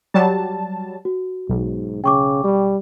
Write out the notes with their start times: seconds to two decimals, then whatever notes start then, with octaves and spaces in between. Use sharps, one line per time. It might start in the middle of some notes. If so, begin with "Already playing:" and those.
0.14 F#3 G3 A5
1.05 F#4
1.49 B1 G#2
2.04 C#3 G5 C#6 D6
2.44 G3